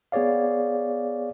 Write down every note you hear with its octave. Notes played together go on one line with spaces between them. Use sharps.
B3 G#4 C#5 D5 F5